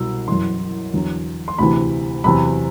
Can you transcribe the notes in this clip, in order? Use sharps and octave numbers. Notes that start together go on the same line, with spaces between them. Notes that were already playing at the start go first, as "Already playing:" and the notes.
Already playing: C2 B2 F#3 E6
F#2 E3 C6
E2 D3 F#3
C6
D2 C3 E3 B5
E2 C3 F#3 B5